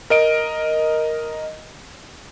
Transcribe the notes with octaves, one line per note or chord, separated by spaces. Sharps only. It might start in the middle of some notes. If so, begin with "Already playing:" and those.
A#4 D#5 D7